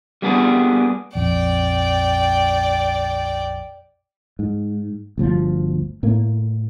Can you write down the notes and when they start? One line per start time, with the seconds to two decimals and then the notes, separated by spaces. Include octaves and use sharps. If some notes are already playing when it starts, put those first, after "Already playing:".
0.22 G3 A#3 B3 D4 G#4
1.15 A#1 F2 D5 G5
4.39 G#2
5.18 G1 D2 F3
6.03 A2 A3 A#3